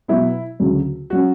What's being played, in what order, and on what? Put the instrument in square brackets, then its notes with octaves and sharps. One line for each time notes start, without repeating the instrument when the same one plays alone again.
[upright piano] B2 F#3 B3 E4
D2 C#3 F#3
F#3 C#4 F#4